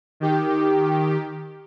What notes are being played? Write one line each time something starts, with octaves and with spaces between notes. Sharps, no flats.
D#3 G4